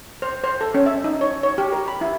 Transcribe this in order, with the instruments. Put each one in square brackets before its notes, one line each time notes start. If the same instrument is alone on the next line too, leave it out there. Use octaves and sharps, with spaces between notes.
[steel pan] C5
C5
A4
C#4
E5
D#4
C#5
C#5
G4
A#4
B5
E4